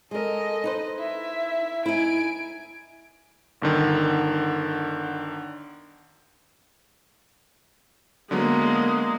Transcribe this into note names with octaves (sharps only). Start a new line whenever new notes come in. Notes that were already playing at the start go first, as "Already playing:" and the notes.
G#3 A4 A#4 D#5
D#4 B4 C5
E4 E5
D#4 E4 G#5 D7
G1 D3 D#3
D3 F#3 G#3 A#3 B3